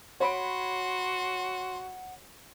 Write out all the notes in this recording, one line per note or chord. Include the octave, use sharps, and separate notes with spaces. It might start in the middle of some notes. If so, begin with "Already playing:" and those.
F#4 C#5 F#5 B5 C6 D7